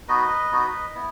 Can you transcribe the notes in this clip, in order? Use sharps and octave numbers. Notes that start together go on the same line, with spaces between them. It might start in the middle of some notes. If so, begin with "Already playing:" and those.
B3 D#4 F#4 B4 D#5
B3 D#4 F#4
B3 E4